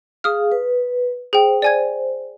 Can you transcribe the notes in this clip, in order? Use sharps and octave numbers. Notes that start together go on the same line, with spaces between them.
G#4 F5 D#6 F6
B4
G#4 C5 G5
C5 D5 G#5 G#6